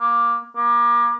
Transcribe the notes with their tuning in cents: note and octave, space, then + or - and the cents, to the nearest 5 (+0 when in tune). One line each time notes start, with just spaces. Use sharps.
A#3 +15
A#3 +35